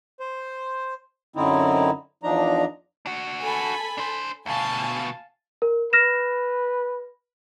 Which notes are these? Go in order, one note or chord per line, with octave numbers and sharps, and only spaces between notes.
C5
F#2 D3 C4 D#4 E4
E2 F3 D4 D#4 A#5
D4 F#4
A4 G#5 B5
D4 C5
D2 B2 F5 G#5 A5
A#4
B4 F6 A#6 E7